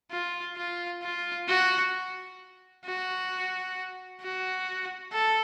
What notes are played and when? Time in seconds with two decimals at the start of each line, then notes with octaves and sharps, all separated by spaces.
0.11 F4
0.57 F4
1.02 F4
1.48 F#4
2.85 F#4
4.21 F#4
5.13 A4